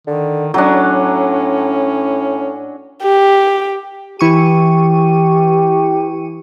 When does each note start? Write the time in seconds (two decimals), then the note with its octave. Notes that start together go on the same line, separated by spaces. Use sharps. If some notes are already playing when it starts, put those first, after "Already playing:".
0.07 D3 D#3
0.54 A2 F#3 C#4 D4
3.03 G4
4.19 E3 G4 C#6 D#7